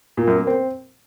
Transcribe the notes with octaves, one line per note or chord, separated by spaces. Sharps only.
A#2
F#2
A#3
C4